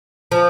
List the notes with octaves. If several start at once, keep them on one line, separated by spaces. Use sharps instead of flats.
F3